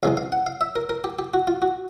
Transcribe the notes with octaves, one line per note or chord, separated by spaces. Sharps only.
C#2 C3 E3 G#3 F5
F5
F#5
F5
E5
A#4
A#4
G4
G4
F#4
F4
F#4